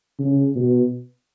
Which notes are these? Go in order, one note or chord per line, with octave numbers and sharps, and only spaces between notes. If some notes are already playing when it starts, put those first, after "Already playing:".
C#3
B2